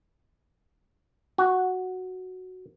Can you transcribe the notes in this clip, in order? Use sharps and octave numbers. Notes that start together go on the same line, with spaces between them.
F#4